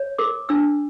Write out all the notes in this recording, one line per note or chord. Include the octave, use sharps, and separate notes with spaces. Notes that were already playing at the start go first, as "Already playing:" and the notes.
Already playing: C#5
A#4 D6
D4 E6